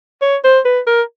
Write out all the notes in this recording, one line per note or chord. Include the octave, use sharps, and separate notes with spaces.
C#5
C5
B4
A#4